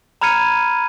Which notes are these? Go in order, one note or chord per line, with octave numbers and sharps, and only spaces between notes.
A#5 B5 F6 G#6 C#7 D#7